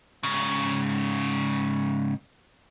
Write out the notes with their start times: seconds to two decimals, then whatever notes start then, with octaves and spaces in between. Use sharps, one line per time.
0.23 G#2 C#3